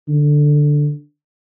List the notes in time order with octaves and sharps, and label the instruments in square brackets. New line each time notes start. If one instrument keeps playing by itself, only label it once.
[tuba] D3